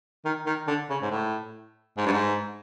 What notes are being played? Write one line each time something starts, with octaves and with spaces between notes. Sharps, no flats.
D#3
D#3
D3
C#3
G#2
A2
G#2
G2
G#2